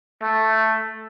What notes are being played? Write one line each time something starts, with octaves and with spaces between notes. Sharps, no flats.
A3